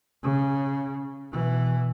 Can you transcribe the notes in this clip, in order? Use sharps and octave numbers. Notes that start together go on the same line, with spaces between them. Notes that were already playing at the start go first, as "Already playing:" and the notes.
C#3
B2 E3